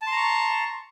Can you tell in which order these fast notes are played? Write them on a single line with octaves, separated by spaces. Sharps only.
A5 C6 A#5 C#6